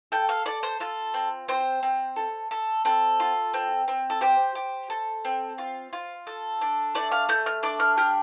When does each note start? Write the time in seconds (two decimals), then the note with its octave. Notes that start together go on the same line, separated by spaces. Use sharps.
0.12 A4 G5
0.29 F5
0.46 A4 D5
0.63 C5
0.80 F4 A4
1.14 C4
1.48 C4 C5
1.83 C4
2.16 A4
2.51 A4
2.85 C4 A4
3.20 F4
3.54 C4
3.88 C4
4.10 A4
4.21 G4 C5
4.55 G4
4.90 A4
5.25 C4
5.58 F4
5.93 F4
6.27 A4
6.61 D4
6.95 A3 D5
7.12 F5
7.29 A3 G6
7.46 F6
7.63 D4 D6
7.80 F6
7.97 G4 F6